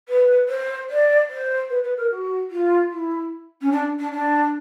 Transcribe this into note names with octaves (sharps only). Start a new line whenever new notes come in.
B4
C5
D5
C5
B4
B4
A#4
F#4
F4
E4
C#4
D4
D4
D4